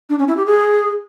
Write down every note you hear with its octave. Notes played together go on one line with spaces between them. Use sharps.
D4
C#4
E4
G4
G#4